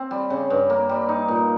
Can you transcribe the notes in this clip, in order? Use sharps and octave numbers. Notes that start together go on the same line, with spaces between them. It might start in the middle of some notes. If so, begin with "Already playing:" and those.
Already playing: C4
G3
C#3
G2
A#3
G3
D#4
A#2